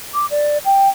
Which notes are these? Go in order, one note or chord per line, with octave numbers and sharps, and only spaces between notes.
D6
D5
G5